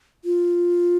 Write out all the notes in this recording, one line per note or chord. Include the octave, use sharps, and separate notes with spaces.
F4